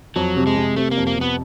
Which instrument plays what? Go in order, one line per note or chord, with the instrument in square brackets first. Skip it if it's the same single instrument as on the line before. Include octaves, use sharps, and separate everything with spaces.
[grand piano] F2 [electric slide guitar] F#3
[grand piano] C3
[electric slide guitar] G#3
[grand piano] C3
[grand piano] C3 [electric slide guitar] A3
[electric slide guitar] A#3
[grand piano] F2
[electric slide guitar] A#3
[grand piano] C3
[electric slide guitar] B3